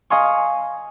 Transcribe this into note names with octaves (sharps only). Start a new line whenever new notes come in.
G#4 D#5 F5 G#5 C6 C#6